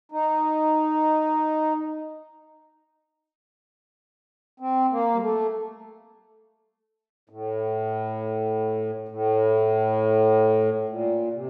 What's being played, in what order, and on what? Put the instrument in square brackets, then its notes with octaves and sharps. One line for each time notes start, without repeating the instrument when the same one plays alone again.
[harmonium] D#4
C4
A#3
G3
A3
A2
A2
A#2
C3